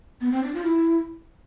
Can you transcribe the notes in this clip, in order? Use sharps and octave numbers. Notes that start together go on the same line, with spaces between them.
B3
C4
D4
F4
E4